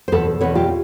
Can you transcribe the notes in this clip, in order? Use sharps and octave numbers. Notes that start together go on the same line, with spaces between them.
C5
E2 B2 A4 B4
E2 B2 B4 C#5
F4 G4